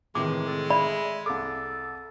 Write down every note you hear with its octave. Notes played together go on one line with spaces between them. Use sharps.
A2 C3 D#3 E3 G#3 D6
A4
D5 E5 B5
C2 A4 D6